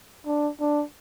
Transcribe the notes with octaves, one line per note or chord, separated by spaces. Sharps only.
D4
D4